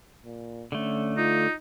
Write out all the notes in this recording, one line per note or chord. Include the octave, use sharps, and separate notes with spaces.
A#2
D3 A3 C#4
D#4 F4